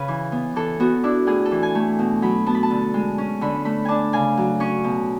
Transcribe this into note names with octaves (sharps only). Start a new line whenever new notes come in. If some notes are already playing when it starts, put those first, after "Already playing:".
Already playing: C#3 C#4 B4 C#5
E3
B3
E3 A4
B3 F#4
D4 E4
A2 G#4
A4
E3
G#5
A3
B2
F#3 B5
B3 A5
B5
A5
D3
G#3
C#4
D3 B5
A3 B5
D4 G#5 A5
C#3 G#5
F#3
C#4 C#6
B2